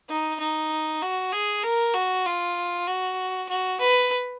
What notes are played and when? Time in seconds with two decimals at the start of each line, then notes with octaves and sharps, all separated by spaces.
0.09 D#4
0.39 D#4
1.02 F#4
1.32 G#4
1.63 A#4
1.94 F#4
2.26 F4
2.87 F#4
3.49 F#4
3.80 B4